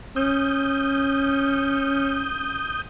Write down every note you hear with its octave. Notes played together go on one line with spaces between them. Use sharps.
C#4 D#6 G6